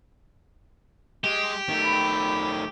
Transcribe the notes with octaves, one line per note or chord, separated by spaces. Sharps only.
G#3 G4
D#3 A3
B5